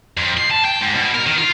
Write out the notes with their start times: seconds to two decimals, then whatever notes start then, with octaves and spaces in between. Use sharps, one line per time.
0.17 F2
0.38 C6
0.51 A5
0.65 G5
0.81 G#2
0.95 B2
1.15 A#4
1.27 D#3
1.38 F4